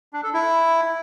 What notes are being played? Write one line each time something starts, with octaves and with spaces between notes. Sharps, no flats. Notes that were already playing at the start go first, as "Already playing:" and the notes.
D4
A4
E4